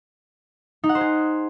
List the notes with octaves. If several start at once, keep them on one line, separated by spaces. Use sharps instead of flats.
D#4
F#5
C5
G#4